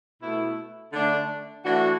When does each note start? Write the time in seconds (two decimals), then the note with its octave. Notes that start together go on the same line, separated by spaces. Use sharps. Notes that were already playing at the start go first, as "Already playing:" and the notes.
0.22 B2 A3 E4
0.92 D3 A3 D4
1.64 E3 A3 D4 F#4